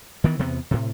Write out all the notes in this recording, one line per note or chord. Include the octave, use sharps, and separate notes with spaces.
D#3 E3 B3
E2 C3 B3
A2 C3